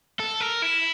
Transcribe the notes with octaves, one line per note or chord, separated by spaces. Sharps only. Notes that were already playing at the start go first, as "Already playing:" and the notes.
A4
A#4
E4